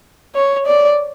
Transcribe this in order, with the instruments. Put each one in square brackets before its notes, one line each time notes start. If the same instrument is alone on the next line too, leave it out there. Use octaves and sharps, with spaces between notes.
[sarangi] C#5
D5